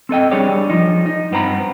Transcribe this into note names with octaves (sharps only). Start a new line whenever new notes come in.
C4 A4 D#5 G5
G3 D4 G#4 C#5 D5
F3 D#4
D#4
G2 B3 C4 A#5 B5